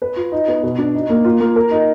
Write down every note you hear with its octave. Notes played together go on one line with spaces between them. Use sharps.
B4
F4
D#4
B3
B2
D4
D#4
A#3
F4
A#3
A#4
D#4